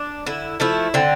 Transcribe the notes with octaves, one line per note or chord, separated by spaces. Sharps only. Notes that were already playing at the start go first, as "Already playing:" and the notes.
Already playing: D4
D3 E4
F3 A3 E4
D3 C4